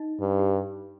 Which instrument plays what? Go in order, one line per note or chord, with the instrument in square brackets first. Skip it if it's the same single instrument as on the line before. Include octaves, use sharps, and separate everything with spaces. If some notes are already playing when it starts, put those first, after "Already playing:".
Already playing: [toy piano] D#4 D#5
[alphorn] G2
[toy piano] G4